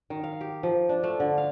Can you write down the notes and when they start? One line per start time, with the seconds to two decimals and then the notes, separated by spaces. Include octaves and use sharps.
0.10 D#3
0.24 F5
0.41 G4
0.63 F3
0.89 D4
1.03 A3
1.20 D3
1.38 F5